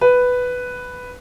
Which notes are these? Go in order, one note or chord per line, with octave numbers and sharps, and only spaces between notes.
B4